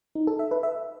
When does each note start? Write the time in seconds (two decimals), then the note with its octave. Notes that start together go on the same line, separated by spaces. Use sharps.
0.15 D#4
0.27 A4
0.39 E5
0.51 B4
0.63 E5